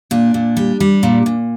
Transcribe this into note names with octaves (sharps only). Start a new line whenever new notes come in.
A#2 D4
A#2
G3
G3
A#2
A#2